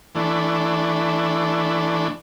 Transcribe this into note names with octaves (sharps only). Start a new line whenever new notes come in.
E3 A3 D4